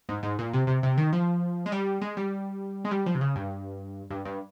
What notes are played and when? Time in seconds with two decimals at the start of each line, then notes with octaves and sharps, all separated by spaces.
0.09 G#2
0.23 G#2
0.39 A#2
0.54 C3
0.67 C3
0.83 C3
0.97 D#3
1.13 F3
1.66 G#3
1.72 G3
2.02 G#3
2.17 G3
2.85 G#3
2.91 G3
3.06 F3
3.15 C3
3.21 C#3
3.36 G2
4.10 G2
4.25 G2